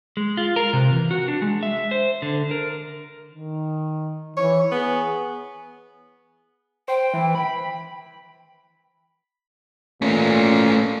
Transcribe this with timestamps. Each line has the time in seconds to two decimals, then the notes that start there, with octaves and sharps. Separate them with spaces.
0.17 G#3
0.37 F4
0.56 A#4
0.73 C3
0.93 E3
1.11 F#4
1.28 D4
1.42 G#3
1.63 E5
1.91 C5
2.22 D3
2.51 A#4
3.32 D#3
4.37 E3 C#5
4.72 B3 G#4
6.88 C5 G5
7.14 E3
7.35 B5
10.02 A#2 A3 C#4